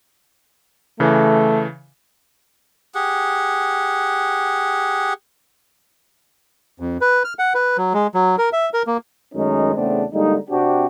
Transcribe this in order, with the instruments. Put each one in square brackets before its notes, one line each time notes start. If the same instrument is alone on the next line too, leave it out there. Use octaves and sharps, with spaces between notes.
[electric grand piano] C#3 E3 [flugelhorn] A3
[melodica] G4 G#4 F#5
[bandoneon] F2
B4
F6
F#5
B4
F#3
G#3
F#3
A#4
E5
A#4
A#3
[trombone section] F#2 D#3 G#3 A3 C#4 D#4
E2 C#3 A3 B3 C4 D4
D3 G3 G#3 A#3 D#4
C3 C4 D4 F#4 G4